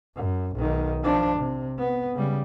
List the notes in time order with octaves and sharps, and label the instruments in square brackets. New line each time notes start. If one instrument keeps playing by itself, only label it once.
[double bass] F#2
B1 D#3
F3 D4
C3
B3
C#3 G3